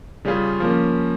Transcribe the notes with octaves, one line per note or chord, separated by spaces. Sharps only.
C#3 G3 C#4 F4 G#4
F3 A#3 C#4